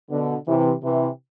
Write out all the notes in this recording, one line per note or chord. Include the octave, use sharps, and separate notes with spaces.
B2 D3
C3 E3
C3 E3